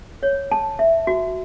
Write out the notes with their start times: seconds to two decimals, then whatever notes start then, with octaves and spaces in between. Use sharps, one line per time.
0.23 C#5
0.52 A5
0.79 E5
1.07 F#4